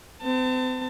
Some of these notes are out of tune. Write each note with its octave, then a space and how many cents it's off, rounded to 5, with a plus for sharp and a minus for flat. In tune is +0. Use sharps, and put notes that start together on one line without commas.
C4 -40 A5 +30